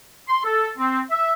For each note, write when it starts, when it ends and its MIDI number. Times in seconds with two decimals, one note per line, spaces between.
0.29 0.42 84
0.44 0.69 69
0.78 1.01 60
1.10 1.33 76